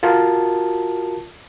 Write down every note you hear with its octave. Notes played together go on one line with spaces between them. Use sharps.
F4 F#4 A#4 A5